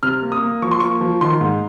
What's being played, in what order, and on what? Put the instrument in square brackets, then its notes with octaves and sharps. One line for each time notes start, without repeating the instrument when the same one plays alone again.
[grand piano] C3 F6
A#3
D#6
A#3
F3 C#6
C6
A#3 C#6
F3
D#3 C6
G#2